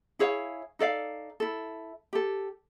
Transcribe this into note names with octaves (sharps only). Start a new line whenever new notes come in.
E4 G#4 C#5 F5
D#4 A4 D5 F5
E4 A4
G4 A4